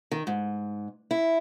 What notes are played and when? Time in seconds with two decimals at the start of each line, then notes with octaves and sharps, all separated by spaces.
0.11 D#3
0.27 G#2
1.11 E4